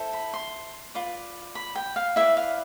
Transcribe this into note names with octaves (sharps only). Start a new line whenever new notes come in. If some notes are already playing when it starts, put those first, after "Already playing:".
Already playing: E4 A4 C5
B5
C6
F4 B4 D5
B5
G5
F5
E4 B4 D5 E5
F5